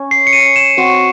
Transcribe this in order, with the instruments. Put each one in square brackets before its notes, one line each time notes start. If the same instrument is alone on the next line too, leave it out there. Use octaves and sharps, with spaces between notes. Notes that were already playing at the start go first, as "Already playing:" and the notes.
Already playing: [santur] C#4 C#5
[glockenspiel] C7
C#7
D#7
E7
[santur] C4 F#4 C5